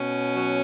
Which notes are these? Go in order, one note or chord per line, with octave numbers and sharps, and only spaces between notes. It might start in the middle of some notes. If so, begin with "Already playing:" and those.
Already playing: B2 C#4
F#3